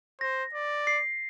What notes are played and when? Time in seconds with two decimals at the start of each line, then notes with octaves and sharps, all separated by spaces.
0.21 C5 A#6
0.54 D5
0.87 C7